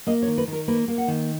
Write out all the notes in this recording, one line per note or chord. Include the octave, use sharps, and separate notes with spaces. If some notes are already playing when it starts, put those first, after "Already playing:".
A#3 D#5
C#5
D#3
B4
D#3 A#4
A#3 B4
A#3
F#5
D#3